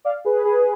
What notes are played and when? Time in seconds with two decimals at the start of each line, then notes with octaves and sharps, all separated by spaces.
0.05 D5 F5
0.25 G#4 B4
0.45 G#4 B4